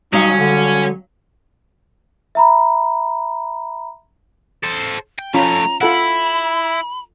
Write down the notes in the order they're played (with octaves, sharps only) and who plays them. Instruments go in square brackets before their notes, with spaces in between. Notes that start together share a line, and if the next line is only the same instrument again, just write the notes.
[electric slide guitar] F#3 G3 F5 [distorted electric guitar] C#4 [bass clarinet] D#4
[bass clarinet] D3
[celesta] E5 A#5 B5
[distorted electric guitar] A4 C5
G5
[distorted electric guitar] F3 A3 [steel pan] C#4 F4 B5 [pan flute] A#5
[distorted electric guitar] E4 [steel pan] F4 A4 F#5 [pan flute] B5